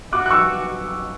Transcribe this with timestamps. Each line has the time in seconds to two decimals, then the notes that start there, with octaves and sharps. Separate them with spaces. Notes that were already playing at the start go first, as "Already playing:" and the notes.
0.13 F#4 D6 F#6
0.26 F#6
0.31 C#6 E6